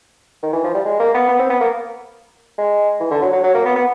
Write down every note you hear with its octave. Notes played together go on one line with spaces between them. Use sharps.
D#3
E3
F3
G3
G#3
A#3
B3
B3
C4
B3
A#3
G#3
E3
D3
F#3
F#3
F#3
A#3
B3
B3